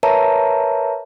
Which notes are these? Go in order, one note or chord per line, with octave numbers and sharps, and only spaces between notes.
A#4 B4 C#5 E5 A5 A#5